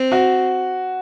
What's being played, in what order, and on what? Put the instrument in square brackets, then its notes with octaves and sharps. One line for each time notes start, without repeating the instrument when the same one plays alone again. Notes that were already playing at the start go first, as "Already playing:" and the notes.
Already playing: [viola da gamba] C4
[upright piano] F#4